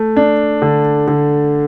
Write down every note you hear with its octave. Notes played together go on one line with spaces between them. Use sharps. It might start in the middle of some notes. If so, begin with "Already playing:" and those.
Already playing: A3
D4
D3
D3